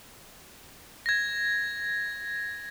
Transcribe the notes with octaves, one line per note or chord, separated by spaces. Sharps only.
G#6 A#6